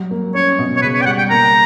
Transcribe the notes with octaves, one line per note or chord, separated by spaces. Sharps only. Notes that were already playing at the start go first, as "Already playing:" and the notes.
Already playing: F#3 G3
A#3
C#4 C#5
B2
C#5
C#3 B4
C#5
G5
G3 F#5
G5
A#3 A#5